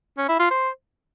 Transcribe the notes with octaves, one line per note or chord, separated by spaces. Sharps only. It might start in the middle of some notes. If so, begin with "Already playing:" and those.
C#4
E4
F4
C5